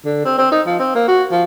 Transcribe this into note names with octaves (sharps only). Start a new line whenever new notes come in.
D3
C4
C4
D#4
F3
C4
A#3
F#4
F3